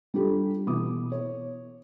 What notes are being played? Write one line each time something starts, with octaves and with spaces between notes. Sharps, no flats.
G3 D4 F4 G4 A4
B2 E3 D6 D#6
C#5